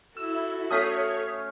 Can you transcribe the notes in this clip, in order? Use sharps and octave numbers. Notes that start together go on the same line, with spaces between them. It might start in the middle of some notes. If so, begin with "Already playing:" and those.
E4 F#4 A4 E6
A3 C#4 C#5 D#6 B6 C7